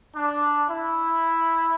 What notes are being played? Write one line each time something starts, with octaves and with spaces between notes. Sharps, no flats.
D4
E4